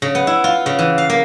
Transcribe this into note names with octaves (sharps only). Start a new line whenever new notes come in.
C#3
B3
E4
F4
C#3
E3
F5
A#3